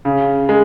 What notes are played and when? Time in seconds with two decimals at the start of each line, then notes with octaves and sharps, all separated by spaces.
0.05 C#3
0.49 G#3